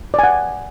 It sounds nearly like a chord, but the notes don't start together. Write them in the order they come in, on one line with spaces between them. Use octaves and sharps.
D5 G#5 F#5